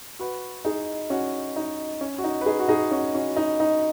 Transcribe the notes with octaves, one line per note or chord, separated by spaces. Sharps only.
F#4 B4
D#4 G#4
C#4 F#4
D#4
C#4
F#4
D#4
B4
D#4 G#4
F#4
D#4 G#4
C#4 F#4
C#4 F#4
D#4
D#4